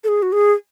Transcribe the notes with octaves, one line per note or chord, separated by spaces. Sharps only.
A4
G#4
F#4
G#4